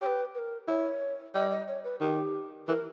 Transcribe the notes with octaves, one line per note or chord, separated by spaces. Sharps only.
G4 B4 C#5
B4
A#4
E4 C#5
G3 D#5
D#5
C#5
B4
D#3 G4
E3 A#4